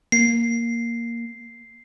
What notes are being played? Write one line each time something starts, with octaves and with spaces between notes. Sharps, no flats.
A#3 C7